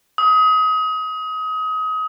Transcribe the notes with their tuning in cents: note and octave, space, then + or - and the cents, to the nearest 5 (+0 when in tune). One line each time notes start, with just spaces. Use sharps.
D#6 +30